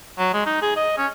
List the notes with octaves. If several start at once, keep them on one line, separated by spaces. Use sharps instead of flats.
F#3
G#3
D#4
G#4
D#5
C#4